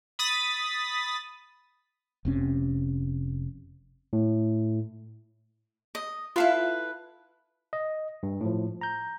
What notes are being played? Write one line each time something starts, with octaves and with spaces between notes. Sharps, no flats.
B5 D#6 A6 B6
F1 C3 C#4
A2
D#5
E4 F4 A4 B4 F5
D#5
G2
A2 F3
A#5 G6